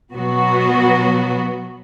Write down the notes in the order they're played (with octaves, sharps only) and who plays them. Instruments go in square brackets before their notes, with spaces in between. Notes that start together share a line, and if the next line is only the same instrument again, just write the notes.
[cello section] B2 F#3 B3 F#4